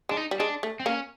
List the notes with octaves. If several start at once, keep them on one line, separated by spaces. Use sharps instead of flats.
G#3 D4
D#4
G3
G#3 D4
A3
C4
A#3 C#4